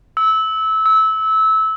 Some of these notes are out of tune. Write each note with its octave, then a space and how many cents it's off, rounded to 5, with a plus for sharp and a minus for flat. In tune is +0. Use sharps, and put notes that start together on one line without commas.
E6 -20
E6 -20